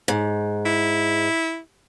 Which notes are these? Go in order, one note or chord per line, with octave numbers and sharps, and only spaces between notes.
G#2
E4